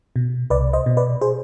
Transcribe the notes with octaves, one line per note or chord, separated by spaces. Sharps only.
B2
C2 B4 D5
C5 D#5
B2
B4 D5
G#4 C5